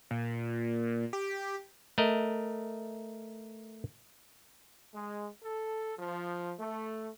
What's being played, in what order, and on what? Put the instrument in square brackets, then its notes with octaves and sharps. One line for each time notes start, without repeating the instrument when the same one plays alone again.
[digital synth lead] A#2
G4
[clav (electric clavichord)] A3 A#4 D#5
[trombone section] G#3
A4
F3
A3